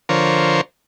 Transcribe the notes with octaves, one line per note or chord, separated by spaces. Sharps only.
D3 F3 A#4 C5 C#5